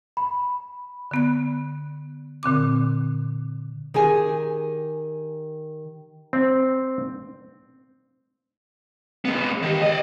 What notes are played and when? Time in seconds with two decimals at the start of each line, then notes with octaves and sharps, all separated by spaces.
0.17 B5
1.11 D3 B3 F#6
2.43 A#2 D3 C4 D6
3.94 D#3 G4 G#4 G#5
6.33 C4
9.25 G#3 B3
9.62 D#3 G4
9.82 D5 D#5